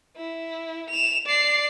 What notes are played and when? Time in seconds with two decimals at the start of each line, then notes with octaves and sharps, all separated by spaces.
0.16 E4
0.89 E7 F7
1.26 D5 C7